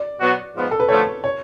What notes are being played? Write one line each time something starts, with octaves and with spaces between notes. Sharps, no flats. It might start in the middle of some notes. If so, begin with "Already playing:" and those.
Already playing: D5
B2 F#3 B3 F#4
G#2 F3 B3
A4
B4
D3 F3 A3 C#5
C#5